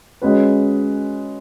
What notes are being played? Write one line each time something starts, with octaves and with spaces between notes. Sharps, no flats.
G#3 C#4 F#4 B4